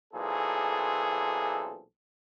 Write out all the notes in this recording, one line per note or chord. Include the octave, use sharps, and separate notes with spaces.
B1 A#2 E3 C4 G#4 A4